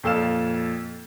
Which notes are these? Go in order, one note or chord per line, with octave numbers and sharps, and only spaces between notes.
F2 A#2 A4 F5 E7